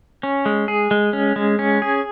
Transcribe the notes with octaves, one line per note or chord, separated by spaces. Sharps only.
C#4
G#3
G#4
G#3
C#4
G#3
C#4
G#4